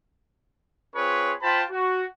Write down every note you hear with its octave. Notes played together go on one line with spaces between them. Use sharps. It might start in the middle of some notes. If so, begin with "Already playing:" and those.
C4 F4 G#4 B4 C#5
F4 C5 G5 A5 B5
F#4